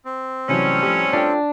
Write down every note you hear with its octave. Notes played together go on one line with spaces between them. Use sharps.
C4
A2 C3 E3 F#3 G3 C#4
F3 A3 G4
D4 F4 A4 G5